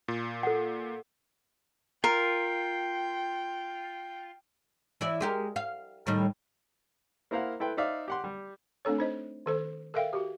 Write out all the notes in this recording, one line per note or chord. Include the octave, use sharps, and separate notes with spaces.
A#2
A4 F#5
F4 A#4 G5
E3 E4 D5
G#3 G4 A#4
F5
A2 D#3 G3
A#3 E4 A#4 C5 F5 F#5
E4 A4 B4 G5 C6
D#4 C5 D5 E5 F5
G4 F#5 C6
G3
A3 C4 D4 A4 C#5
D#4 C5 D#5
D#3 A4 C5
A4 A#4 E5 F5 G5
F#4 G4